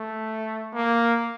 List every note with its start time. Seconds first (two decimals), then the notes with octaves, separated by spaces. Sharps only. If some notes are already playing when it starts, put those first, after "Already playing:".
Already playing: A3
0.74 A#3